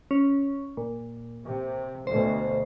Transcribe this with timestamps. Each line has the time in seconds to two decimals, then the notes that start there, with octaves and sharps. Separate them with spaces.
0.11 C#4
0.77 A#2
1.45 C3
2.07 D2 B2 C5